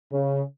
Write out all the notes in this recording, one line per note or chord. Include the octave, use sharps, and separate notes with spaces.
C#3